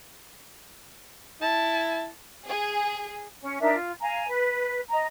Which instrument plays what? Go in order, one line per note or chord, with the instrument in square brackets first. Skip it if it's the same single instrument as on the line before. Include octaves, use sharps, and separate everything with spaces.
[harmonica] E4 [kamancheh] A5
[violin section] G#4
[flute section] C#4
D4 D#4 A#4 E5
F4
F5 G#5 A#5
B4
D#5 A#5